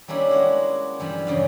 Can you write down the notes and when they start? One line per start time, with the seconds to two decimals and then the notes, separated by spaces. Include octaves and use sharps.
0.08 G3 A#3 C#4 D4 E4
0.31 G#3 F#4
1.00 G2 E3 F3 G3
1.27 E2 G2 C#3